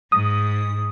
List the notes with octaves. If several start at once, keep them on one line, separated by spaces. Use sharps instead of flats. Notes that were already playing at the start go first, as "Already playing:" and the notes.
G#2 D#6